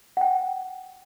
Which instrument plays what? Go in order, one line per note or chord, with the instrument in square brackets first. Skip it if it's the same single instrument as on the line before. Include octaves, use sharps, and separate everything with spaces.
[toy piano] F#5 G5